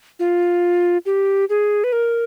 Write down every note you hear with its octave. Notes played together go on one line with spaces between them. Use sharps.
F4
G4
G#4
B4
A#4